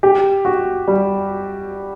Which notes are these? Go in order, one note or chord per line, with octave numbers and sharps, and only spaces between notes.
G4
F#4
G3